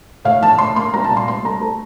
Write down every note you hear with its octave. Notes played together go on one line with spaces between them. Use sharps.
A2 F5
F3 A5
A2 C6
A#3 C6
C2 A#5
A5
A#2
C6
C2 C6
A3 A#5
A3